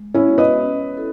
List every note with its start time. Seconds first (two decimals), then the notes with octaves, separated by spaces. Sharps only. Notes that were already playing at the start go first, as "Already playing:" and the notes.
Already playing: G#3
0.14 C#4 E4
0.27 B3 F#4 C#5 E5
0.38 B4 D#5
0.62 C#4
0.97 E4 A4